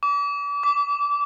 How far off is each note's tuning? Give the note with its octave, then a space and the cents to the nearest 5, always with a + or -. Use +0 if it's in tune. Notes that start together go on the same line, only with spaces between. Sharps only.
D6 -40
D6 -25